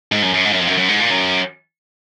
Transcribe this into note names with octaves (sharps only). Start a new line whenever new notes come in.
G#2
F#2
F#2
G#2
F#2
F2
F#2
F#2
G#2
A#2
F#2